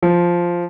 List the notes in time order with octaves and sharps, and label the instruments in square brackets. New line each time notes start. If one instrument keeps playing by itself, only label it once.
[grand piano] F3